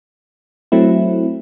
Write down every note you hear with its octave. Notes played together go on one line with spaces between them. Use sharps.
F#3 A3 C4 E4